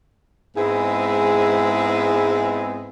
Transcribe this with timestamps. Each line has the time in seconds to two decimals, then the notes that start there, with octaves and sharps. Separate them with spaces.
0.57 G#2 G#3 B3 C4 E4 G#4